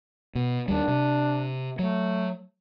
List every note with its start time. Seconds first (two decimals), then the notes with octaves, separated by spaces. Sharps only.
0.35 B2
0.68 D#2 G3 D4
0.88 C3
1.79 F#3 A3